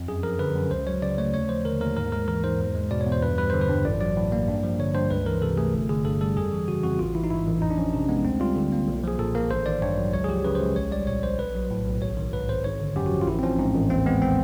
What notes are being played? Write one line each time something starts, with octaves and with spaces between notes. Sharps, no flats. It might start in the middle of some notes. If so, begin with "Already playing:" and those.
Already playing: F2
F#2 G#4
F3 A#4
D3 B4
F#2
C#2 C5
F#3 C#5
C#3 D5
A3 C#5
D#2 C#5
F3 C5
D3 A#4
D#2 A#4
G#2 A#4
G#3 A#4
E3 A#4
G#2 C5
E2
G#3
B2 D5
C#5
E2
C5
G2 B4
G3 B4
D3 C5
B4
G2
A1 D5
F#3 D5
A2
A#3
G2
F3
D3 C#5
G2 C5
C#2 B4
E3 A#4
C3 A4
A3 G#4
G1
D3 G#4
G2 A4
G3 A4
F2 G#4
E3
C#3 F#4
F2 F#4
A1 F4
E3 E4
D#4
G#2 E4
A1
F2 D#4
D4
F3 C#4
C3
G#3 B3
D2 C4
G3 F4
D3
A#3
B1
F3 G#4
A#2 A4
A#3 A#4
A1 C5
D#3 D5
G2 C#5
F#3
C#2 C#5
G#4
F3 G4
C#3 B4
C5
C#2
A#1 C#5
G3 D5
A#2 C#5
A#1 C5
B1 B4
F#3
A2
B1
G#1 C#5
D#3
G#2 B4
G#1 C5
G#1 C#5
D3
F#2 G4
F#4
F3
F4
A1 E4
C4
F3 C#4
G#2
A1
D#2 C4
G#3 B3
D#3 C4